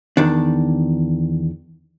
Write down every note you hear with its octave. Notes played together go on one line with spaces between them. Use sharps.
E2 D#3 D4